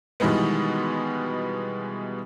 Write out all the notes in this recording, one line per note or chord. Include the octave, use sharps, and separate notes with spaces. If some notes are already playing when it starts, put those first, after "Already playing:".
B2 D#3 E3 G3 G#3 B3